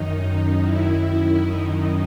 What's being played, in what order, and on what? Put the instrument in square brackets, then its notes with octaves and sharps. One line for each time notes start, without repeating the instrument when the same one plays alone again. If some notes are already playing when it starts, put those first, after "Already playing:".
Already playing: [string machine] F#2 D#3 D#4
F#2 D#3 E4
F#2 D#3 D#4